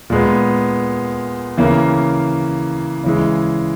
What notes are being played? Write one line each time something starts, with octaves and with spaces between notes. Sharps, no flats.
A#2 G#3 B3
C#3 E3 A#3
C#3 E3 G#3